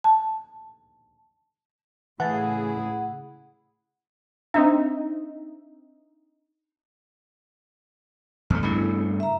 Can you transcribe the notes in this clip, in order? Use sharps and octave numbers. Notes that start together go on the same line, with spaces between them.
A5
A2 C#3 E3 E4 G#4 F#5 A5
C4 D4 D#4 E5
E2 A3
G2 C#3 A3 B3 E4
E5 A#5